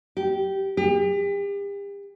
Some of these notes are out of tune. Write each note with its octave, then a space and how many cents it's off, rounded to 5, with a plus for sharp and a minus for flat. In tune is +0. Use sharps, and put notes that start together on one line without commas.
G4 -15
G4 +40